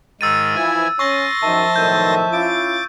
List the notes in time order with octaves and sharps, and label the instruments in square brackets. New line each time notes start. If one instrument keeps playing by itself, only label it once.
[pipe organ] G#2 D#3 [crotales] E6 A6 D#7
[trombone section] E3 F3 [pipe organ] E4 G#5
[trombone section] C#4 [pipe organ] C6 A6 A#6 [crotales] C#6
[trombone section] F#2 D#3 [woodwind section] F3 E5 A5
[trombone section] B1 A2 D#3 [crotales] G6
[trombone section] C#4 E4 F4 [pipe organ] D6 A6